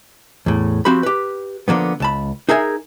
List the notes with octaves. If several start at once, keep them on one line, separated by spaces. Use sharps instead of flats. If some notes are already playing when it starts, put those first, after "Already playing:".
E2 A2
F3 C4 F#4 G4 B5
G4 B4
D3 F3 A#3 B3
C#2 A5 B5
D#4 G#4 A#4 E5 G#5